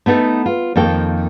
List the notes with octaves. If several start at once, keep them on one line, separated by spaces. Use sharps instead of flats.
A3 B3 D#4 A4
F4
F2 D#3 A#3 A4 G5